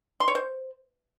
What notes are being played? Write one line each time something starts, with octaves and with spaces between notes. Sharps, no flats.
C6
C#5
C5